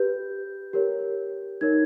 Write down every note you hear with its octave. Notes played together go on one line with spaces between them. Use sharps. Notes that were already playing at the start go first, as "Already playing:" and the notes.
Already playing: G4 B4 G6
G4 A#4 C#5
D#4 A#4 C#5 G#6